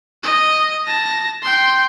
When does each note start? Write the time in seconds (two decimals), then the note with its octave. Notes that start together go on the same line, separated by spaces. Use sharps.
0.23 D#5
0.85 A5 A#6
1.42 G5 C6